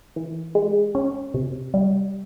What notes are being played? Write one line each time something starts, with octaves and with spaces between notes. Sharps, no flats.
E3
G#3
C#4
C3
G3